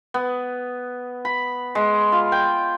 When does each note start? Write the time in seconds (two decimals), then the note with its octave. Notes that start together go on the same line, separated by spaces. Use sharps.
0.14 B3
1.25 B5
1.75 G#3
2.12 F4
2.32 G5